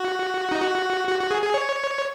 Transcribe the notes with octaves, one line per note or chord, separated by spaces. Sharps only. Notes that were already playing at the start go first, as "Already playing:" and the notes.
Already playing: F#4
D#4
F#4
F#4
F#4
G#4
G#4
C#5